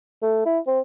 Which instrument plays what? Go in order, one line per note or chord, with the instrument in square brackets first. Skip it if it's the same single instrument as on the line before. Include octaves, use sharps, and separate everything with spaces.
[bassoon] A3
E4
C4